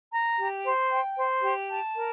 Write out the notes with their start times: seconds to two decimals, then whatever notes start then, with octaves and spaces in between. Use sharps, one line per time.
0.12 A#5
0.38 G4
0.64 C5
0.90 G5
1.17 C5
1.43 G4
1.69 A5
1.96 A#4